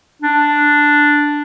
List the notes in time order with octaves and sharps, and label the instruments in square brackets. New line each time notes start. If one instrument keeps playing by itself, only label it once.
[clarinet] D4